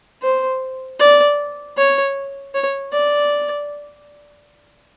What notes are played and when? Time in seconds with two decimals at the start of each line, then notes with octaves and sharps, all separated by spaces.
0.23 C5
1.00 D5
1.77 C#5
2.54 C#5
2.93 D5